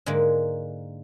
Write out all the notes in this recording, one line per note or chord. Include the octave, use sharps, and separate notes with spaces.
G#2 D3 G#3 A#3